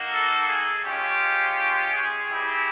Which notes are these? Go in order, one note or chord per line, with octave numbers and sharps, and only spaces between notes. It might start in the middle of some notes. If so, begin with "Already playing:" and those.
Already playing: A#3 D#4 F#4
A4
G#4
G#3 C#4 F4 G4
G#4
C4 E4 G4